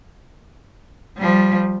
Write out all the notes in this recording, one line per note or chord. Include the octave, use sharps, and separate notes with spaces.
F3 G3